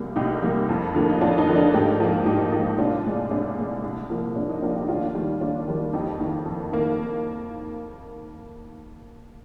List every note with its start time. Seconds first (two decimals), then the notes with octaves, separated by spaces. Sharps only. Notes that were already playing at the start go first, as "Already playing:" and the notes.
Already playing: C2 A#2 G3 A#3
0.16 C2 D#4 G4
0.42 A#2 G3 A#3
0.69 F2
0.95 D3 F3 A#3
1.10 D#4
1.21 F2 D4 F4
1.38 D#4
1.47 D3 F3 A#3
1.56 D4
1.74 G#2 G4 A#4
2.00 F3 A#3
2.26 G#2 D#4 G4
2.52 F3 A#3
2.78 C2 D4 F4
3.05 A#2 G#3
3.31 C2 D4
3.57 A#2 G#3
3.83 C2
4.09 A#2 F3 A#3
4.36 C2 D4
4.49 D#4
4.62 A#2 F3 A#3 D4 F4
4.75 D#4 G4
4.88 D#2 D4 F4
5.15 D#3 G3 A#3
5.41 D#2 D4 F4
5.68 D#3 G3 A#3
5.93 F2 D#4 G4
6.19 D#3 A#3
6.46 F2
6.72 D#3 A#3